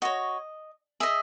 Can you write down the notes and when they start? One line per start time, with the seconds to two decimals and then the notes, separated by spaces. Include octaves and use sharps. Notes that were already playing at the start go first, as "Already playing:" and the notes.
0.02 F#4 C#5 D#5
1.00 G#4 D#5 E5